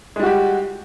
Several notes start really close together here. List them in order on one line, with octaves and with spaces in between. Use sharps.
G#3 G3 F#4 G4